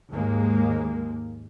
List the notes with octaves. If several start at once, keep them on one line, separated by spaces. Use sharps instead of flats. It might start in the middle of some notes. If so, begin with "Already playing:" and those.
D#2 G#2 G#3 A#3